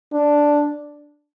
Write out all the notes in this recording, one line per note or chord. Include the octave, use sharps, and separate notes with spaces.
D4